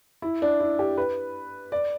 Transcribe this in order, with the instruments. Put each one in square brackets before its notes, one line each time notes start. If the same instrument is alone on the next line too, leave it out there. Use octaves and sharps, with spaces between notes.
[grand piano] E4
D4
E4
G4
B4
D5